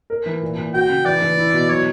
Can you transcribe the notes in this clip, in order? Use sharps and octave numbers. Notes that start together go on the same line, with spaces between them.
A#4
E3
A#2
A#2
F#4 G5
C#3
E3 D5
E3
E4
B2
F#3 C#5